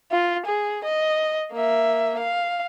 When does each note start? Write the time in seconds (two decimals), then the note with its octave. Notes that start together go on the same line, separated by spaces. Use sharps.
0.12 F4
0.46 G#4
0.84 D#5
1.53 A#3 E5
2.19 F5